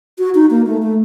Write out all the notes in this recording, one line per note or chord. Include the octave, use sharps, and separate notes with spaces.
F#4
D#4
A#3
A3
A3